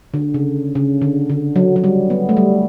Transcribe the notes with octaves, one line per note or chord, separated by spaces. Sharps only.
D3
C#3
C#3
D3
D3
F#3
F#3
G3
B3
A3
G3